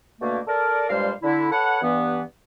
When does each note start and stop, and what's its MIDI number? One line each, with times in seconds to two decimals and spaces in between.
0.21 0.39 47
0.21 0.39 50
0.21 0.39 57
0.21 0.39 58
0.48 0.87 69
0.48 0.87 70
0.48 0.87 74
0.90 1.12 43
0.90 1.12 46
0.90 1.12 55
0.90 1.12 56
0.90 1.12 72
0.90 1.12 77
1.23 1.50 50
1.23 1.50 64
1.52 1.80 69
1.52 1.80 71
1.52 1.80 73
1.52 1.80 78
1.82 2.22 43
1.82 2.22 52
1.82 2.22 59